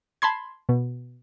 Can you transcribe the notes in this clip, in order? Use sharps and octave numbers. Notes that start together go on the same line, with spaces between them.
A5 B5 C6 G#6
B2